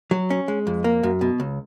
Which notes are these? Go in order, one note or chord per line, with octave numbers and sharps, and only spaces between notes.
F#3
C#4
G#3
F2
A#3
F#2
B2
C#2